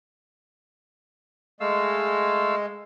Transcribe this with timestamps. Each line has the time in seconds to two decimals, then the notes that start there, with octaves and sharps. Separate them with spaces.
1.60 G#3 A3 F5 E6